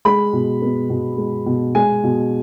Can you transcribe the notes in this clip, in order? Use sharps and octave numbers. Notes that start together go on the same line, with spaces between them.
G#3 B5
B2
B3
B2
G#3
B2
G#3 G#5
B2